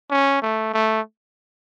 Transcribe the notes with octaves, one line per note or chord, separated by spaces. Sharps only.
C#4
A3
A3